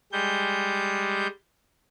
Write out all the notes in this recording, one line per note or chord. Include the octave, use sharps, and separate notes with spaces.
G3 G#3 G6